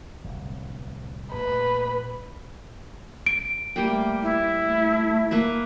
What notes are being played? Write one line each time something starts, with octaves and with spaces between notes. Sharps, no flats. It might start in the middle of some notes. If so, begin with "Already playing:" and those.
D1 C2
A#2 A3 B4
D7
G3 A3 A#3 G5
E4
A3
A#3 B4 E5